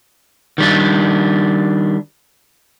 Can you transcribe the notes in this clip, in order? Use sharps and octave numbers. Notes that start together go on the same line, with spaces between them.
D#3 G3 D4